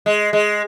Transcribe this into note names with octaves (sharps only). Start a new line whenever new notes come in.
G#3
G#3